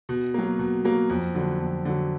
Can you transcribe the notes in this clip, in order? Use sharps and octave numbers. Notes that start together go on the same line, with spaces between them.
B2
F#3 A#3
B2
F#3 A#3
F2
D3 F#3
F2
D3 F#3